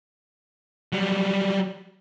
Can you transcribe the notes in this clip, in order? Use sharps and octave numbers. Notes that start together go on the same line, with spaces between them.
F#3 G3